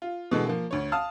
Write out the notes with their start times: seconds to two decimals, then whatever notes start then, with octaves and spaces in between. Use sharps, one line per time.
0.02 F4
0.31 B2 D3 E3 G#3 A4
0.47 F3 A#3
0.71 D2 C#5
0.92 F5 A5 D#6 F6